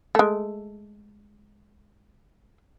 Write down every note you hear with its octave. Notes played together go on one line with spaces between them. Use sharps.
G#3 A3